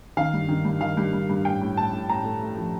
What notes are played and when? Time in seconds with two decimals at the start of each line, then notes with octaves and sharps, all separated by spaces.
0.17 D#3 F5
0.33 G2
0.49 D#3
0.65 G2
0.81 D#3 F5
0.97 G2
1.13 G2
1.29 G2
1.45 A2 G5
1.61 A2
1.77 A2 A5
1.93 A2
2.09 A2 A#5
2.25 A3
2.42 A3
2.57 F3